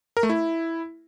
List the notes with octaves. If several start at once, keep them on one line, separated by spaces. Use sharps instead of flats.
A#4
A3
E4